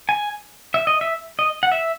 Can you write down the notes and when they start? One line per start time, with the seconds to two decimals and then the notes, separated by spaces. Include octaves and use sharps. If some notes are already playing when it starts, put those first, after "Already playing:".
0.09 G#5
0.74 E5
0.87 D#5
1.01 E5
1.39 D#5
1.63 F#5
1.72 E5